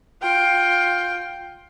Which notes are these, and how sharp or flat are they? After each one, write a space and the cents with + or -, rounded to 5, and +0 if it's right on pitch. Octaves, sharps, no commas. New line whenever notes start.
F4 +15 G5 +0